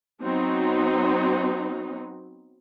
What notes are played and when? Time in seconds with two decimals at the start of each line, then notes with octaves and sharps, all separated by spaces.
0.22 F#3 B3 C4 D#4